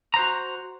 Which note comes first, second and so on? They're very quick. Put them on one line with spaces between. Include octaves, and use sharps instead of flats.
A#5 C5 F#4